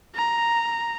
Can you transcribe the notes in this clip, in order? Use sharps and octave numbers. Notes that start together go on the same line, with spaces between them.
A#5